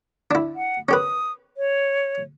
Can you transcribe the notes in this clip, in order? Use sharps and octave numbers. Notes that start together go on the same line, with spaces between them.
D4 E4
F#5
C#4 G4 B4 D#6
C#5